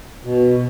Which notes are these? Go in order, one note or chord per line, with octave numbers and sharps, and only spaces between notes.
B2